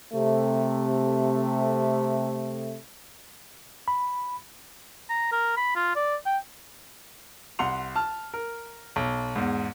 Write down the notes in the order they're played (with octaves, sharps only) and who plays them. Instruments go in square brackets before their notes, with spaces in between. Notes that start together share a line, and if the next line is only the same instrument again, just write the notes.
[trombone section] C3 A3
[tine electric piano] B5
[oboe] A#5
A#4
B5
F4
D5
G5
[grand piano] C2 F#5 C6 F7
A5 F6
A#4
B1
E2 G#2